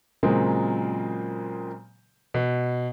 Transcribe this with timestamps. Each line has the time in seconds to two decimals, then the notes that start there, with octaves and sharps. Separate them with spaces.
0.23 A#2 C#3 F#3 G#3 A#3 C4
2.34 B2